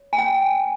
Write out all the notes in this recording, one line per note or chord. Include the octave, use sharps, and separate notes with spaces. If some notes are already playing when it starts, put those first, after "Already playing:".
Already playing: C#5
G#5
G5